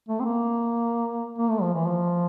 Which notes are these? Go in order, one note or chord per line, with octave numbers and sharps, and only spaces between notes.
A3
C4
A#3
A#3
A3
F3
E3
F3